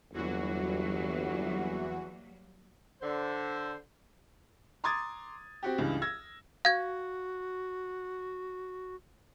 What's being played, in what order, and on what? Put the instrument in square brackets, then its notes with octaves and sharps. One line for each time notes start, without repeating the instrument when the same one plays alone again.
[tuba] G1 [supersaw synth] E2 E3 F#4 [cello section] F#3 G3 A#3
[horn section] D3 C5
[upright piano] A#5 C6 D6 D#6 G#6 A6
C4 F#4 G4
C#2 G2 E3
E6 G#6 A#6
[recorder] F#4 [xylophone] F5 G#6